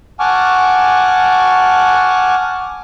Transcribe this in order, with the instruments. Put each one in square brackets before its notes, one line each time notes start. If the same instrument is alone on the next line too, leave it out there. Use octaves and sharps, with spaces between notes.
[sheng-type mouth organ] F#5 G#5 A5 C#6 D6 F6